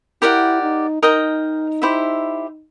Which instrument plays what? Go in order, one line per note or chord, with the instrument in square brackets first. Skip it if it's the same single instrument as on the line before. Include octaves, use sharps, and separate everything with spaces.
[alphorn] E4 [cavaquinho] G4 A#4 D5 F#5
[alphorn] D#4
[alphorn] D#4 [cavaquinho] A#4 D#5 G5 A#5
[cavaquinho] E4 G4 C5 E5